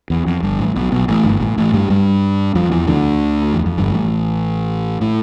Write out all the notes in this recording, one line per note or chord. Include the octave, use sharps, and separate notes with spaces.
E2
F2
G1 G2
A1 A2
B1 B2
B1 B2
A1 A2
G1 G2
A1 A2
A1 A2
G2 G3
G2 G3
F2 F3
E2 E3
D2 D3
E2
F2
G1 G2
A1 A2
A2